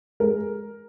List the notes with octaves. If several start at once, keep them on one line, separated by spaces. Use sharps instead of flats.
G#3 A#4